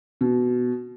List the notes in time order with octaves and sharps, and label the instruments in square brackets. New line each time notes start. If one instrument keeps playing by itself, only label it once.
[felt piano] B2